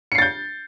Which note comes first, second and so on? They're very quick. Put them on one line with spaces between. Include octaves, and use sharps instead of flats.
C#7 C7 A6 G6